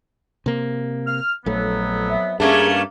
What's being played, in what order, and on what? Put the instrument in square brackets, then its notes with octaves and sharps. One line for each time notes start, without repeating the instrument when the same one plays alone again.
[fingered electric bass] C3 A#3
[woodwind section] F6
[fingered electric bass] A#1 A3 [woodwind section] F2 F#3 B3
[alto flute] E5
[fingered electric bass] G2 [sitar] A3 A#3 C#4 [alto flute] G#4